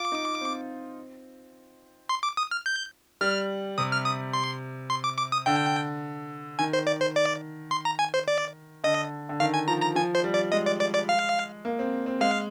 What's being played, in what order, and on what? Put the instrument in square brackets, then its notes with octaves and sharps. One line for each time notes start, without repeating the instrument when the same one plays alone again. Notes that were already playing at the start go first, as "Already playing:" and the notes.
Already playing: [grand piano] F4 [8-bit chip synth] D6
[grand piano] D#4
C4
[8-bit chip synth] C6
D6
D#6
F6
G6
[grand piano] G3 [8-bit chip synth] F6
[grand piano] C3 [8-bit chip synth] D#6
[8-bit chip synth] F6
D#6
C6
C6
D6
D6
D#6
[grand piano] D3 [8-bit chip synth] G5
[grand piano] D#3 [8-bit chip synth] G#5
[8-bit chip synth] C5
D5
C5
D5
C6
A#5
G#5
C5
D5
[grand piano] D3 [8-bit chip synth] D#5
[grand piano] D3
[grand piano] D#3 [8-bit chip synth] F5
[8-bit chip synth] G#5
[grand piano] F3 [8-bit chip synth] A#5
[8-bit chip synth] A#5
[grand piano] F3 [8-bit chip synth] G#5
[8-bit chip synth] C5
[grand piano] G3
[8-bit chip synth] D5
[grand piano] G#3 [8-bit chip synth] D#5
[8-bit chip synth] D5
D5
D5
F5
[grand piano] A#3
C4
C4
[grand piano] G#3 [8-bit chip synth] F5